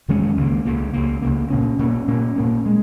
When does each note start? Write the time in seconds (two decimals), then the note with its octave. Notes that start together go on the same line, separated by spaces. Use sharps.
0.08 F#2 D#3 G#3 C#4
0.37 C#2 C#3 A#3
0.65 C#2 C#3 A#3
0.93 C#2 C#3 A#3
1.22 C#2 C#3 A#3
1.50 A#2 A#3 C#4
1.79 A#2 A#3 C#4
2.08 A#2 A#3 C#4
2.36 A#2 A#3 C#4
2.66 G#3